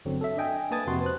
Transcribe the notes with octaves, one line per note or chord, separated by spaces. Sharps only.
G1 D3 F#3 C4
A4 E5
D4 D#5 G5 G#5
A#3 B4 A5 D#6 G#6 A6
F2 C3 F#4 B4 C6
C5 F#6